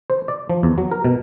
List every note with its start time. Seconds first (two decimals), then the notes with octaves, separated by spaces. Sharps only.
0.10 C5
0.28 D5
0.49 F3
0.63 E2
0.78 F#3
0.91 A#4
1.04 B2